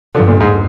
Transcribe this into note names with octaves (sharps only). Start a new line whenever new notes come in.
G2 D3 F3
A#2 D3
G#2